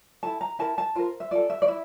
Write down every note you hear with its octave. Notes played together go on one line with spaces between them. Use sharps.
E4 A4 A5
A#5
E4 A#4 A5
A5
F4 A#4 C5
E5
F4 A4 D5
E5
D5
E4 E5